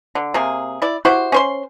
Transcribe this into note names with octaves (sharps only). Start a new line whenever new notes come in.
D3
C3 A#3 G#4
E4 D5
E4 F#4 G4 C5
C#4 C5 C6